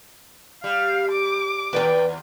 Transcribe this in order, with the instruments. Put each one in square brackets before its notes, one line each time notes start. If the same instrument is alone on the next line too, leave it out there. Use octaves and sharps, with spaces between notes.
[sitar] G3 [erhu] F5
[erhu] D6
[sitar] D#2 [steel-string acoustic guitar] B4 D5 G5